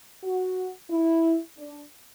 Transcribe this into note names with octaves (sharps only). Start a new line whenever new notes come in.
F#4
E4
D4